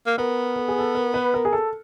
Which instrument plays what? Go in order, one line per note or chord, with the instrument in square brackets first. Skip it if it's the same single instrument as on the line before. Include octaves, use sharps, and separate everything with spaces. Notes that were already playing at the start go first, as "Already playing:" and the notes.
[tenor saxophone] A#3
[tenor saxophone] B3 [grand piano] A#4
[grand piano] A4
G#4
A4
A#4
B4
A#4
G#4
A4